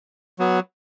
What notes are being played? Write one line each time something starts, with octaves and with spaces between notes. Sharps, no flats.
F#3 B3